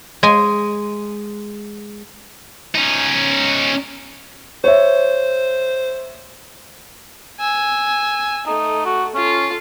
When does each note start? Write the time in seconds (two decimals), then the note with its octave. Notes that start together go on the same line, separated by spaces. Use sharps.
0.23 G#3 G#4 G#5
2.75 C#4 D#4
4.64 C5 C#5 E5
7.40 G#5 E6
8.47 A3 D#4
8.86 F#4
9.15 C#4 F4 A4